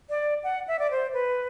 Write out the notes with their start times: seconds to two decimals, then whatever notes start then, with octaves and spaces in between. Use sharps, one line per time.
0.10 D5
0.44 F#5
0.68 E5
0.79 D5
0.91 C5
1.14 B4